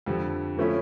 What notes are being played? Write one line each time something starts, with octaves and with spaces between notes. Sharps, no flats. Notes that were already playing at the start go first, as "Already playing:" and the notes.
F2 D3 G3
D3 F3 A3 C#4 E4